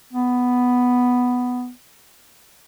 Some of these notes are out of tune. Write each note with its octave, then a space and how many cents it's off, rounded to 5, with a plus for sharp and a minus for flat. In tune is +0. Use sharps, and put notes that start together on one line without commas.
B3 +5